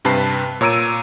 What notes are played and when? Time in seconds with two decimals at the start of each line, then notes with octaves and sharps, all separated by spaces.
0.05 G2 C3 B4 A5 C7
0.61 A#2 C#5 A#5 E6 D7 D#7